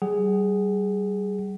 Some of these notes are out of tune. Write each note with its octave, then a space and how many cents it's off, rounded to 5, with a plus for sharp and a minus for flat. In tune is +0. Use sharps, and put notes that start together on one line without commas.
G3 -25 G#4 +0 F#5 +35